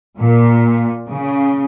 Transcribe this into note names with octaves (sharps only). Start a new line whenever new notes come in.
A#2
C#3